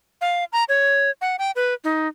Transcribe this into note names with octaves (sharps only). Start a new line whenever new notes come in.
F5
A#5
C#5
F#5
G5
B4
D#4